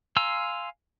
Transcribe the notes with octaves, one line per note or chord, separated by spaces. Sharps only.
F5 G#5 A#5 C6 E6